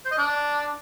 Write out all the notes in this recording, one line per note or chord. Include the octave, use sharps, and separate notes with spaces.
C5
D#5
D4